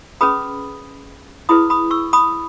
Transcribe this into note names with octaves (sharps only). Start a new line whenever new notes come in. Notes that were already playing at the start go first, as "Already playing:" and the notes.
C#4 G#4 B4 B5 D#6
E4 G#4 B4 B5 D#6
B5 D#6
C#6 E6
B5 D#6